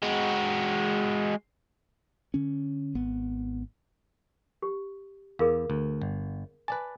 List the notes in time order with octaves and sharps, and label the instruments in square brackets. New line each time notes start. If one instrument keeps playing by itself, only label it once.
[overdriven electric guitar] G#3 F#4
[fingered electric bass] D3 C#4
G#1 B3
[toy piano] G4
[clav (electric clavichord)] E2 [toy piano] G#4 A#4 F5
[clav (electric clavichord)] D2
G1
[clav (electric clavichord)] B4 D5 A5 [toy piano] G#5